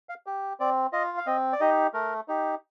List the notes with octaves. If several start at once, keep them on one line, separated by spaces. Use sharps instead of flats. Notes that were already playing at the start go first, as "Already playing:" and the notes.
F5
G4
C4 D5
F4 D#5
F5
C4 D#5
D5
D#4 G4 D#5
A3 A#4
D#4 G4